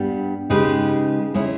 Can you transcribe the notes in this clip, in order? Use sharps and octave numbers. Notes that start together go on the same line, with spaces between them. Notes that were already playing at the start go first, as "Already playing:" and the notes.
Already playing: G2 G3 B3
C#3 G#3 D#4 G4 B4
C#3 G#3 C#4 E4